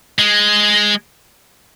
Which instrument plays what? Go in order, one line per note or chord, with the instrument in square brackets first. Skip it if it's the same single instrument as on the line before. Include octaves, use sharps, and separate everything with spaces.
[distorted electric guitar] G#3